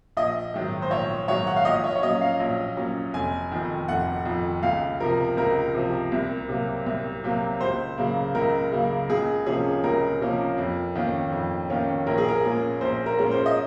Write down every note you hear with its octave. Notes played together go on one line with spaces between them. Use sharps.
A#1 D#5
G#2 D#3 F#3
C5
A#1 C#5
G#2 D#3 F#3 C#5
F#5
F5
A#1 D#5
C#5
C#5
A#2 F#3 C#4 D#5
F5
A#1
A#2 F#3 C#4
F1 G#5
F2 D#3
F1 F#5
F2 D#3
C#2 F5
C3 F3 A#4
C#2 A#4
C3 F3
C2
C3 F#3 A#3
C2
C3 F#3 A#3
C#2 C5
C#3 F#3 A#3
C#2 A#4
C#3 F#3 A#3
C#2 G#4
C3 F3 A#3 C#4 G#4
C#2 A#4
C3 F3 A#3 C#4
F2
D#3 A#3 C#4
F2
D#3 A#3 C#4
A#1 A#4
G#4
A#4
A#2 G#3 C#4
A#1 C5
A#4
A#2 G#3 C#4
C5
D#5